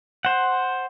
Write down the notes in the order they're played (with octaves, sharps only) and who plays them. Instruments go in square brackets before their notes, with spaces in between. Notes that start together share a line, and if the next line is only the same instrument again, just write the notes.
[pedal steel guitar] C5 F#5